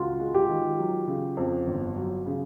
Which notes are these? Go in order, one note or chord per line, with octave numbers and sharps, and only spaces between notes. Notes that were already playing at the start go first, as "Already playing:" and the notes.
Already playing: C#2 F4 F#4
G#3
G4
D#3
F#3
C#3
F2
G1
F#3
C#3